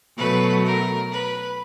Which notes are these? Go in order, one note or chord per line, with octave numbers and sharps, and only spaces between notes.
B2 F#3 A3 B4
A#4
B4